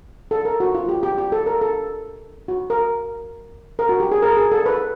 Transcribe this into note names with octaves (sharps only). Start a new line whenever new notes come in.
A4
A#4
F#4
F4
G4
G4
G4
A4
A#4
A4
F#4
A#4
A#4
F#4
G4
G#4
A#4
G#4
A4
B4